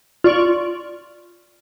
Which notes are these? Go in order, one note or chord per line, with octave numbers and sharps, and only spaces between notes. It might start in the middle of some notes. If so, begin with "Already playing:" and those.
F4 D5 C#6